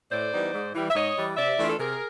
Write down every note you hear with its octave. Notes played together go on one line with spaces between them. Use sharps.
A2 C5 D5
E3 G3 B3 D#4
G#2
E3 G3
E5
G#2 C#5 D#5
E3 G3
C3 D5 E5
E3 A3 D4 F4
A4
C3 G#4 A#4